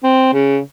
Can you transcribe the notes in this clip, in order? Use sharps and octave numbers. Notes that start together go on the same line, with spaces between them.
C4
C#3